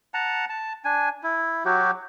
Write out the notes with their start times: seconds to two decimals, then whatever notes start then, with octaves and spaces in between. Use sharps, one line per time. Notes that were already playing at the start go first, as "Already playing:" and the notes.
0.14 F#5 A5 A#5
0.49 A5
0.85 D4 G#5
1.23 E4
1.65 F#3 F#4 G4